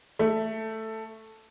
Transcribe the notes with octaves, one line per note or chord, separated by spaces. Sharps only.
A3